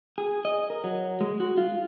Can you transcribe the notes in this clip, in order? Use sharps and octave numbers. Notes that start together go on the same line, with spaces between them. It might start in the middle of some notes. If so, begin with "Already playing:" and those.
G#4
D#5
A#4
F#3
G#3
F#4
F4